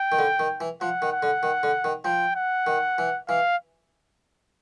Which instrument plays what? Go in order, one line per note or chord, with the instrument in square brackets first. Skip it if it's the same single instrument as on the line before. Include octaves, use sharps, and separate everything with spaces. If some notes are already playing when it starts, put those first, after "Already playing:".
Already playing: [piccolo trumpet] G5
[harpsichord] D#3
D3
D#3
E3
[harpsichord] F3 [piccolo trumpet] F#5
[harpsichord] D#3
[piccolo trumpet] F#5
[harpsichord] D3
D#3
D3
D#3
[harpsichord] F3 [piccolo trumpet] G5
[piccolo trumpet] F#5
[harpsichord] D#3
E3
[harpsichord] E3 [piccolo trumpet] F5